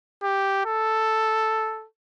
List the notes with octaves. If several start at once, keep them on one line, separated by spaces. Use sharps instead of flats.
G4
A4